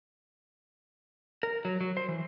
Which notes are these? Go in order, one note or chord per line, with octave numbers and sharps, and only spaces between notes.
A#4
F#3
F#3
C5
E3